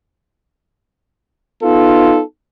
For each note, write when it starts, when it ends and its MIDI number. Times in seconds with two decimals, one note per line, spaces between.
1.62 2.21 59
1.62 2.21 63
1.62 2.21 65
1.62 2.21 69